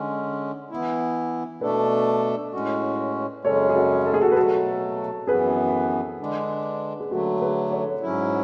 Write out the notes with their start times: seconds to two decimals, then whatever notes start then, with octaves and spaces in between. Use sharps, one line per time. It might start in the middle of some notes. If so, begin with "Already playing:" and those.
Already playing: D3 G#3 C#4
0.70 E3 B3 E4
1.61 B2 A3 D4 A4 B4 D5
2.53 A2 G#3 C#4 F#4
3.45 F#2 C#3 G#3 C#4 A4 C#5
3.69 G#4
3.75 F#4 A4
4.06 A4
4.14 G#4
4.22 F#4 A4
4.32 B4
4.36 B2 F#3 A3 F#4 A4
5.27 F#2 E3 B3 G#4 B4
6.20 D3 G#3 D4
7.00 G#4
7.11 D3 F#3 A3 F#4 A4
7.41 G#4 B4
7.72 A4 C#5
8.02 G#2 F#3 C#4 E4